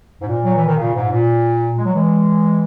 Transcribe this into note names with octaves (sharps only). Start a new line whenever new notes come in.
G#2
A#2
F#3
E3
D#3
A#2 C#3
G#2
A#2
G#3
F#3
E3 G#3